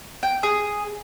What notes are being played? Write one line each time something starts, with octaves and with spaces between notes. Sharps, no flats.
G5
G#4